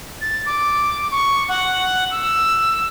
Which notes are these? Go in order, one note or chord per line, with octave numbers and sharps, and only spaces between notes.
A6
D6
C#6
F#5
E6